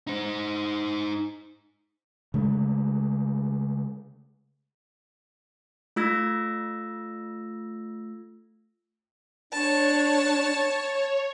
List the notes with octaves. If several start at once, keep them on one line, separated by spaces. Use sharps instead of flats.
D#4 C5
C#3 G#3 A3
A3 F4 E6 G#6 A#6
D4 C#5 A5